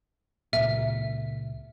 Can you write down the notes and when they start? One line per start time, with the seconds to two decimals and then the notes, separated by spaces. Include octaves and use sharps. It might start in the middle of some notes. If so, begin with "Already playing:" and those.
0.53 C#2 A#2 E5